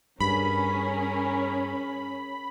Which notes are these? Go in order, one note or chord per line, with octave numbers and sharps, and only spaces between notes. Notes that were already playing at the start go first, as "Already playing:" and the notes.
G2 C#4 G#4 A#4 B5